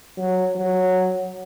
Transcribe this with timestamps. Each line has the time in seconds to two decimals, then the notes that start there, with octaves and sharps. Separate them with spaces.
0.18 F#3
0.56 F#3